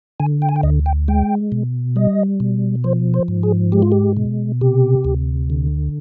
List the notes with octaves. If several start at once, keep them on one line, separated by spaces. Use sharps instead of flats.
D3 G#5
G5
G#5
G5
D2 D#5
G5
G#3 G5
B2
G3 D#5
B2
F3 C5
C5
G#2
G#4
G#3 G4
F4
G4
B2
C3 G4
D2
D3